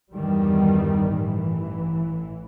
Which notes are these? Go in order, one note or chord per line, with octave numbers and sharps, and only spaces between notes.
E2 G2 D#3 E3 G3
A1 E3